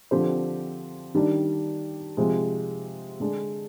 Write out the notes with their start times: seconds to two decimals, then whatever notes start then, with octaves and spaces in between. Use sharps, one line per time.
0.11 D3 F3 C4 G4 C5
1.15 D#3 G3 D4
2.17 C3 F3 G#3
3.20 D3 G#3 D4